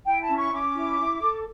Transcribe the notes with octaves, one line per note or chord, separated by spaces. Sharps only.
E4 G5
A5
C#4
C#6
C#4 D6
E4
E4
A4